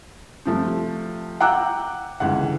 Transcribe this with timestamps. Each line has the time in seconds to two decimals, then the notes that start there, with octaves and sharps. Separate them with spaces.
0.46 C3 F3 A3
1.40 F#5 G5 A#5 D6 E6 F#6
2.20 C#2 D3 E3 F#5